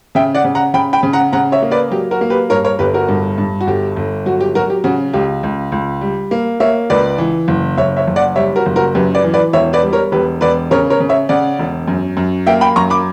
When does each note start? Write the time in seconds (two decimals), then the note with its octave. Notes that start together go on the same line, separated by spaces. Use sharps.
0.15 C#3 E5 G5
0.35 D5 F#5
0.44 C#3
0.55 F#5 A#5
0.74 C#3 G5 B5
0.93 G5 B5
1.03 C#3
1.13 F#5 A#5
1.32 C#3 F#5 A#5
1.52 C#5 E5
1.62 A#3
1.71 B4 D5
1.91 F#3 G4
2.11 F#4 A#4
2.21 A#3
2.30 G4 B4
2.50 G2 A#4 C#5
2.64 A#4 C#5
2.79 G1 G4 B4
2.94 F#4 A#4
3.08 G2
3.38 G2
3.61 F#4
3.67 G1 G4
3.96 G1
4.26 F#3 F#4
4.41 G4
4.55 F#3 F#4 A#4
4.70 G4
4.84 C#3 F#4
5.13 C#2 G4
5.43 C#2
5.72 C#2
6.01 G3
6.31 A#3
6.60 A#3 C#5 E5
6.90 C#2 B4 D5
7.18 E3
7.48 F#1
7.77 F#1 C#5 E5
7.97 C#5 E5
8.07 F#1
8.16 D5 F#5
8.36 G3 C#5 E5
8.56 F#4 A#4
8.66 F#1
8.76 F#4 A#4
8.95 F#2 G4 B4
9.15 B4 D5
9.24 E3
9.34 B4 D5
9.53 E1 C#5 E5
9.73 B4 D5
9.83 G3
9.93 A#4 C#5
10.12 E1 G4 B4
10.41 E1 B4 D5
10.71 C#3 A#4 C#5
10.90 A#4 C#5
11.00 C#3
11.09 C#5 E5
11.29 C#3 D5 F#5
11.59 E1
11.88 F#2
12.17 F#2
12.47 A#3 E5 G5
12.61 G5 B5
12.76 F#2 A#5 C#6
12.90 B5 D6